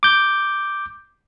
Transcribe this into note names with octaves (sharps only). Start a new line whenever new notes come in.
D6 G6